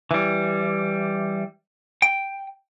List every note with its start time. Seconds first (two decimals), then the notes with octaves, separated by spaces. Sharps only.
0.11 E3 G3
2.02 G5